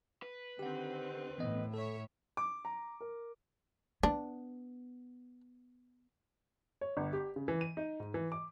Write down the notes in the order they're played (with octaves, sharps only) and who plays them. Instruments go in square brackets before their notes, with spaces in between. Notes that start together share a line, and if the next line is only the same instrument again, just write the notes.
[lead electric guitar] B4
[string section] D3 D#3 C4 [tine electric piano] G4 F#5
[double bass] A2 [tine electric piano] E3 B3 D#5
[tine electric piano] A4 [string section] C#5 E5
[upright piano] D6
A#5
A#4
[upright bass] B3 [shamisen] D4
[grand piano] C#5
G1
G4
C#3
E3
D#7
D#4
G#2
E3
D6